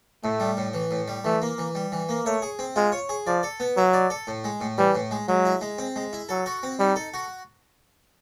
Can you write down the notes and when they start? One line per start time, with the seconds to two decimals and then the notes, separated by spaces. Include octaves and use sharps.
0.24 A2 A3
0.40 G3
0.57 A2
0.74 E3
0.91 A2
1.08 G3
1.25 E3 A3
1.42 A#3
1.58 E3
1.75 G3
1.92 E3
2.09 A#3
2.26 A3 C#5
2.42 G#4
2.59 C4
2.76 G#3 F4
2.92 C#5
3.09 G#4
3.27 F3 D5
3.43 A4
3.60 B3
3.77 F#3 E4
3.93 D5
4.10 A4
4.27 A2
4.44 G#3
4.61 A2
4.78 E3 G3
4.95 A2
5.11 G#3
5.28 F#3 G#3
5.45 E4
5.61 G#3
5.78 C4
5.96 G#3
6.13 E4
6.29 F#3 A4
6.46 F#4
6.63 C4
6.79 G3 D#4
6.96 A4
7.14 F#4